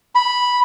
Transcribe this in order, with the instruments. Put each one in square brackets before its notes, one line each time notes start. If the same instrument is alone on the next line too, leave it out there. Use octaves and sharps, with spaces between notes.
[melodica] B5